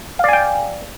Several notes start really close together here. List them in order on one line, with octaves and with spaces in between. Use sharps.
F5 D5 G#5 G5